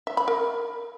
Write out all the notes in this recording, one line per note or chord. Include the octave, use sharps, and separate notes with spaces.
E5
B5
A#4